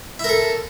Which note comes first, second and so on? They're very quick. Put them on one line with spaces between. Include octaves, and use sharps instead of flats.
E4 A#4 A4